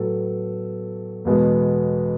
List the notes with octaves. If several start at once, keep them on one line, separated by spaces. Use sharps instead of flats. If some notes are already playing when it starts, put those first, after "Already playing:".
Already playing: A2 F#3 B3 A4
E2 B2 G#3 B3